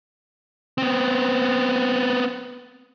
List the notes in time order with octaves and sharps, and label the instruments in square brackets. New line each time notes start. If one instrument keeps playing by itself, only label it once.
[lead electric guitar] B3 C4